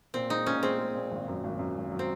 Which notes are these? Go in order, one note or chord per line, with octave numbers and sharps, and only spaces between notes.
A#2 C4
G#3 D#4
A#2 C#4
G#3 C4
G#3
A#2
G#1
F#2
G#1
F#2
G#1
F#3
C4